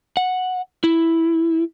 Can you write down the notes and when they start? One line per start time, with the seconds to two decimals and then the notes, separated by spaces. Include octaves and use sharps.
0.17 F#5
0.84 E4